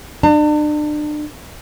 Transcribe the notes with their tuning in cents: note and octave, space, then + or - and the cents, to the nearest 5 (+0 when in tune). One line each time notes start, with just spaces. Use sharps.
D4 +35 A5 +45